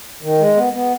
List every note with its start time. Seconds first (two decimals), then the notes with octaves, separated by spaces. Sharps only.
0.22 D#3
0.39 G#3
0.55 B3
0.73 B3